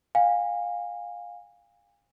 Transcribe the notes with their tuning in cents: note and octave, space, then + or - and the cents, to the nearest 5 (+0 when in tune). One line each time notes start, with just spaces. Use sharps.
F5 +20 G#5 -35